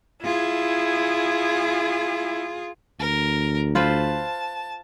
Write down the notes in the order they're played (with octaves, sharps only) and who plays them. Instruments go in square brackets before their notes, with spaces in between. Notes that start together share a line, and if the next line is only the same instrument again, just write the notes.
[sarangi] E4 [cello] F4 G#4
[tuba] D2 [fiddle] A#4
[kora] F4 B4 C5 [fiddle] A5